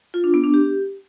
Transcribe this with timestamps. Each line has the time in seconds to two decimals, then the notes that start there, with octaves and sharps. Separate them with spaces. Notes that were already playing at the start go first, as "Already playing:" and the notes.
0.14 F4
0.24 D4
0.34 B3
0.44 D4
0.54 G4